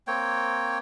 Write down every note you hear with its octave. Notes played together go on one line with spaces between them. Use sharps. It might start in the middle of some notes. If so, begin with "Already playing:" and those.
A#3 C4 C#5 G5